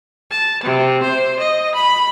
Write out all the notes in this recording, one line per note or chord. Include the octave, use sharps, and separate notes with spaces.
A5
C3
C5
D#5
B5